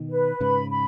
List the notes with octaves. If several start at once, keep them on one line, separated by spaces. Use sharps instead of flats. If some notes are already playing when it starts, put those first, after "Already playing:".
Already playing: B2 D#3
B4
G#2 C#3 B5
B5